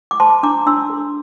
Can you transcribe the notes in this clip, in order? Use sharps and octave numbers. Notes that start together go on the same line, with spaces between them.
D6
C5 A5 C6
D4 A#5 D6
D4 C6 E6
A4